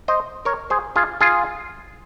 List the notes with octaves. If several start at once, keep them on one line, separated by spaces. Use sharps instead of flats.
C5 D#5
A#4 C#5
G#4 C5
F4 G#4
F4 G#4